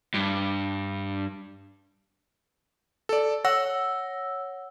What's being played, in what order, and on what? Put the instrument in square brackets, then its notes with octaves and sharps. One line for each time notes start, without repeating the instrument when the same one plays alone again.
[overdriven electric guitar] G2
[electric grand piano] A4 D5
[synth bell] C#5 F#5 E6 [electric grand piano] A#6